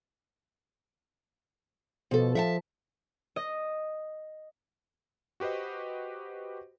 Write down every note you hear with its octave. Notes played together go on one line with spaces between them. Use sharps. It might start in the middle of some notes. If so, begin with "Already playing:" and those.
B2 F3 A4
F3 E5 F#5 A5
D#5
F#4 G4 B4 C5 D#5